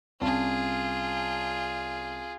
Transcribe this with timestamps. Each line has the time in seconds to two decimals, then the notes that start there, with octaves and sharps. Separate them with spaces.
0.21 C2 C#4 F4 G#4 A5